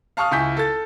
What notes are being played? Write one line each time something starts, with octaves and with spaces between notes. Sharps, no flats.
F5 A5 C#6 D#6 F6
C#2 E4 G#5 C#6 G6 B6
A4 A6